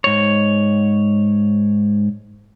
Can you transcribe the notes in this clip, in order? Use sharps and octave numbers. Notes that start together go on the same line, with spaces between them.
G#2 C#5